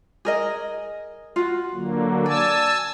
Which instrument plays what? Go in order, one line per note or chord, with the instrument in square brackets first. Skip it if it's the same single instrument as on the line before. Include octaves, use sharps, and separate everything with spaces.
[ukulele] G#4 A#4 D#5
F4 F#4
[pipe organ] D3 F#3 A#3
[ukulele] D5 [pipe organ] G#5 A5 E6